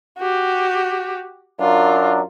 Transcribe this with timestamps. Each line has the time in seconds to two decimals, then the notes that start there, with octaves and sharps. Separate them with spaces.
0.18 F#4 G4
1.60 F#2 D4 F4 A#4